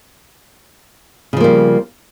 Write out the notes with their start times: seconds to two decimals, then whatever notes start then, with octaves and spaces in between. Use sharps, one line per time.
1.33 C#3
1.37 F3
1.40 A#3
1.44 G3